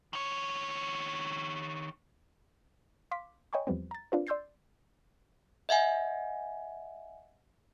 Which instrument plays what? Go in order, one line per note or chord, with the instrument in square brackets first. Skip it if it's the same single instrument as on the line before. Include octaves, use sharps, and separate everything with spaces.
[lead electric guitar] D#3 C#5
[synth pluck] F5 C6 D6 B6
C#5 D#5 G5 G#5 B5 C#6
E2 F3 G3 B3 C4
A#5 A6
C4 D4 F4 B4
D5 C6 E6 G6 A6 C7
[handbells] D#5 E5 F#5 G#5